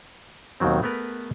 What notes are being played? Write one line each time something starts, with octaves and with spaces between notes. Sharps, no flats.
D#2 B2 D#3 F#3 C4
A3 B3 G#4 A#4 B4